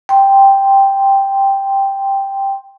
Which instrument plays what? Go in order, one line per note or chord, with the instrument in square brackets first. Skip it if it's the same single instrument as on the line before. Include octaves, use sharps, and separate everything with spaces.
[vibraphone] G5 C6